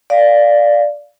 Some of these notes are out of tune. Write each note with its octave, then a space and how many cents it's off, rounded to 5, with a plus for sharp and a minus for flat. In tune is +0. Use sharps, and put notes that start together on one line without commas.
D5 +0 F5 +0